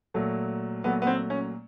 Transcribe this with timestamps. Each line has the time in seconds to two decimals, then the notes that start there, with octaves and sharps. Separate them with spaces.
0.14 A#2 F#3 A3
0.84 A#2 F#3 A3 B3
1.02 B3
1.07 C4
1.30 C#4